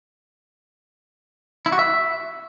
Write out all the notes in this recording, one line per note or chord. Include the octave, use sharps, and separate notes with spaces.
E4
F#4
E5